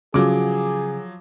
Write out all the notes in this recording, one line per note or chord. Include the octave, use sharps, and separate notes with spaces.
C#3 F3 F#3 G#4 D6